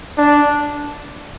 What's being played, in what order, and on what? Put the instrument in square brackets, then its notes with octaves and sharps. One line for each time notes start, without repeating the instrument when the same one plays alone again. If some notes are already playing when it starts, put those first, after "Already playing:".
[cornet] D4